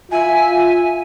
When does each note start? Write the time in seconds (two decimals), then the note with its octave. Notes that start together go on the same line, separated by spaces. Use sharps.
0.11 F4 E5 G#5